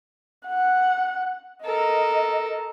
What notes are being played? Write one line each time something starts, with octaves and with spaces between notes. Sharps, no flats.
F#5
A4 A#4 D#5